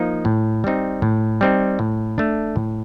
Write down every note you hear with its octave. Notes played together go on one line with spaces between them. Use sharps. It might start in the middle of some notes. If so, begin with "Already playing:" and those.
Already playing: F3 A#3 D#4
A2
G3 C4 D#4
A2
G3 C4 D#4
A2
A3 D4
A2